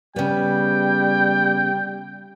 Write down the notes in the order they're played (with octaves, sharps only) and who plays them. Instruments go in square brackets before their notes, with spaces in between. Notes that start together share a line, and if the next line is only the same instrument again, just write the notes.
[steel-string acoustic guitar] C#3 B3 [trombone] G3 [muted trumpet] G5